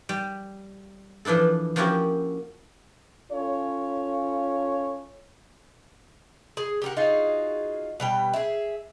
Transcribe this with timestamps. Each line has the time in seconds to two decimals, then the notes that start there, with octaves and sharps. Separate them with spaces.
0.09 G3
1.25 E3 F3 D4 E4 A4
1.76 F3 A#3 C#4 E4 F#4 G4
3.32 C#4 F4 A4 C#5
6.57 G#4
6.82 G4 A#4 F#5
6.97 D#4 F4 F#4 G#4
8.00 B2 G3 G5
8.34 G#4 E5